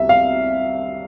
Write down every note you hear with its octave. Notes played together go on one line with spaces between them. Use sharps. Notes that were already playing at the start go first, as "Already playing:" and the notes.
Already playing: C2 E5
F5